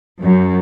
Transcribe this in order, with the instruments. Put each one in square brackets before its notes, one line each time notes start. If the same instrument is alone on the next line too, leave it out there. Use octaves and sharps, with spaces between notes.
[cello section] F#2